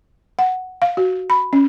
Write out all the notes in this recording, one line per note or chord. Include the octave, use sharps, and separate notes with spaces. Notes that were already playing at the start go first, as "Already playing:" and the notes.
F#5
F5
F#4
B5
C#4